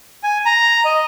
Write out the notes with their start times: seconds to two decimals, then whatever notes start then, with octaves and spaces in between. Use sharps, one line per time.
0.23 G#5
0.46 A#5
0.85 D#5